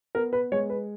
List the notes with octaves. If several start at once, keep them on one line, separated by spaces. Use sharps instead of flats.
B3 A#4
B4
G#3 C#5
B4